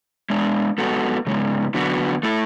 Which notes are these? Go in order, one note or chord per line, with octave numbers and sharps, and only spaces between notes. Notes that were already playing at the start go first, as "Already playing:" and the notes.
G#3 B3 D4
G#3 B3 F#4 A4
C#3 G#3 B3
D3 F#3 B3 F#4
A3 E4 A4